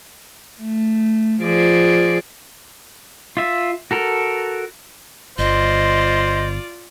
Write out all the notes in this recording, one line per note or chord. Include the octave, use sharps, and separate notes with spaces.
A3
F3 G#4 D5
F4 E5
F#4 A4 A#4
G1 F4 C5 D5 D#5